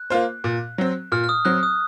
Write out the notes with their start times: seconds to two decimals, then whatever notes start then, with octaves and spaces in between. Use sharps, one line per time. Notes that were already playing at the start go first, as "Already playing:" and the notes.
Already playing: F#6
0.10 A#3 F4 C5
0.44 A#2
0.78 F#3 C4
1.12 A#2 F6
1.24 F6
1.29 D#6
1.45 F#3 C4 F#6
1.63 D#6